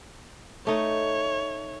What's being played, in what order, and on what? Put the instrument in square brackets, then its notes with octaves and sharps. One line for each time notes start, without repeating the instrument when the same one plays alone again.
[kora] A3 D#4 [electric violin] C#5